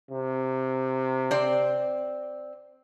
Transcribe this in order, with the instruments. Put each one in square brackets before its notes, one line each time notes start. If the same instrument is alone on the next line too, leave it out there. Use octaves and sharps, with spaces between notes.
[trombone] C3
[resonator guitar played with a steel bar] C4 D5